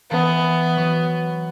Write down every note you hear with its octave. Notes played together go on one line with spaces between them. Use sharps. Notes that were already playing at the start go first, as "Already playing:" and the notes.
E3 B3
F#3